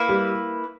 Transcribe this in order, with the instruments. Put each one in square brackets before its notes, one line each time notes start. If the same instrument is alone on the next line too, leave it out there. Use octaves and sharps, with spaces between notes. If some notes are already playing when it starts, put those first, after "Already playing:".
Already playing: [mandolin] A#3 E4 B4
[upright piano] G3